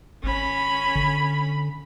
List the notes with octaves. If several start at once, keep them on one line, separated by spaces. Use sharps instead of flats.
G#1 C#4 B5
D3